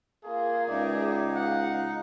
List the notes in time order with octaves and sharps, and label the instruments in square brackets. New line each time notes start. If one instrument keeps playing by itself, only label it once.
[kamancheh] A#3 F4 [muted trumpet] G#4
[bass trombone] C#2 [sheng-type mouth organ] D#4 [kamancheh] D5 E5
[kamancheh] F5 [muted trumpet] F#5